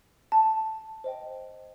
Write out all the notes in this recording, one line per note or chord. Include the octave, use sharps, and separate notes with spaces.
A5
C5 D#5 G5